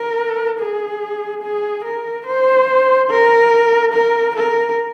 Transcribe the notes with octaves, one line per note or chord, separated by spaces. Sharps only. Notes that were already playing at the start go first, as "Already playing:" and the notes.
Already playing: A#4
G#4
G#4
A#4
C5
A#4
A#4
A#4